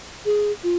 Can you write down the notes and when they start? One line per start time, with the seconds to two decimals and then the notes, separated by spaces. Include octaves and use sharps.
0.25 G#4
0.63 F4